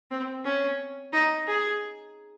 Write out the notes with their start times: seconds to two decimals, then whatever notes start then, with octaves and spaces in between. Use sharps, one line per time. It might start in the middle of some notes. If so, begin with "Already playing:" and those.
0.11 C4
0.45 C#4
1.13 D#4
1.47 G#4